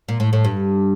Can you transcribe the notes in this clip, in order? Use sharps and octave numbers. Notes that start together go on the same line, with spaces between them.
A#2
A2
A2
G2